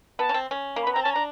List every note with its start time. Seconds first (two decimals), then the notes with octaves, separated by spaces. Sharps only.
0.19 B3 A5
0.29 C#4
0.34 C4
0.51 C#4
0.76 A#3
0.83 B3 B5
0.93 C4 A#5
1.03 C#4 A5
1.13 D4 A#5